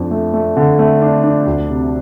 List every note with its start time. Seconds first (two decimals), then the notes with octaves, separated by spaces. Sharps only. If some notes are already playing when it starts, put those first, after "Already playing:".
Already playing: F2 D4
0.11 A3
0.34 A3
0.57 D3
0.79 A3
1.02 D4
1.24 D4
1.46 D2
1.69 C3